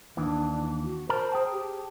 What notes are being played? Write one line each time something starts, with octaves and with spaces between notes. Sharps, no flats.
D#2 E3 D4
F#4
A#4 C5 A5 A#5
G#4 G5 A5
G4